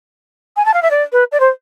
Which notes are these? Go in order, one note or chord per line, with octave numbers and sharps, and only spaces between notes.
G#5
A5
F5
E5
D5
B4
D5
C5